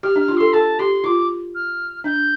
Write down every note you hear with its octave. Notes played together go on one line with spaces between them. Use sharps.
G4 F6
D4
F6
F4
A4 C6
A4 A5
G4 C6
F4 D6
F6
D4 G6